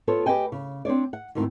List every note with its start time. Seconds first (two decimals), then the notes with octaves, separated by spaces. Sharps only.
0.07 B3 F4 A4 C5 C#5
0.26 G4 B4 C5 D#5 G5 G#5
0.52 C#3
0.85 C4 D4 C#5 D5
1.13 F#5
1.35 D2 G#2 D#3 C4 E4